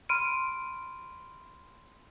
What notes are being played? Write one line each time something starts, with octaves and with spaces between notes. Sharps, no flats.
B5 C6 F6 D7 D#7